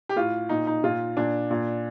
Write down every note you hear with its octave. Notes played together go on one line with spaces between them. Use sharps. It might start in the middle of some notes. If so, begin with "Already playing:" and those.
G4
A2 F4
A#2 D#4
D#4
A#2 F4
A#2 D4
A#2